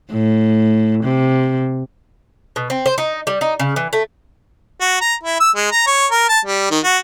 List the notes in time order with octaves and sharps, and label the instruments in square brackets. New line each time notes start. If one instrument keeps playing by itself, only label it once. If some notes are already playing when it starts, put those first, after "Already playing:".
[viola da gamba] A2
C3
[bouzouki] B2
C4
C5
D#4
G3
D#4
C#3
E3
A3
[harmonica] F#4
A#5
E4
E6
G#3
A#5
C#5
A#4
A5
G3
D#3
F#4